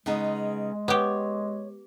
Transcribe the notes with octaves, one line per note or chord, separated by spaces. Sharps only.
C#3 G#3 B3 D#4
B3 G4 C#5